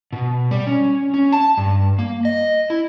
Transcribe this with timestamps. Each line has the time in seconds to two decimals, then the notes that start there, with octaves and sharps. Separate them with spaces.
0.13 B2
0.51 G3
0.67 C#4
1.14 C#4
1.32 A5
1.57 G2
1.99 A#3
2.25 D#5
2.70 E4